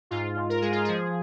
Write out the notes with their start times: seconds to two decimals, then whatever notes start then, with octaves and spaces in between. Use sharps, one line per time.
0.11 G#2 F4
0.37 G#2
0.50 A#4
0.62 G#3 G#4
0.72 F4
0.85 F3 G#4